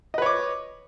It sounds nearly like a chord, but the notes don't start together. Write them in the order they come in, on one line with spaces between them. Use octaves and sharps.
D#5 B4 C#5 D6